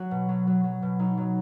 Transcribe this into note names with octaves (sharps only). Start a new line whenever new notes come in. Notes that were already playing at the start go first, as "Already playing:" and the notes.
Already playing: F#3 F#4
B2
F#3
F#3
F#3
B2
F#3 D#4
F#3